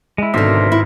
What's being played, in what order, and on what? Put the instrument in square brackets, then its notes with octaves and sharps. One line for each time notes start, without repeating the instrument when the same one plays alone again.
[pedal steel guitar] G#3 E4
[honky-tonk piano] G#1 [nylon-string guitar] B2 D3 [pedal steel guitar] A#4 C5 E5
[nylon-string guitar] E4